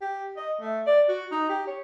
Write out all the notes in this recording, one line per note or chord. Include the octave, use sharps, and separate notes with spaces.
G4
D#5
A3
D5
F#4
D#4
G4
C#5